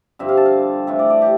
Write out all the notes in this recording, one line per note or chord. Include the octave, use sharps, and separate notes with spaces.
G2 D3 F3 C4 E5
F5
A5
F5
A2 E3 A3 C4 E5
D5
D5
G4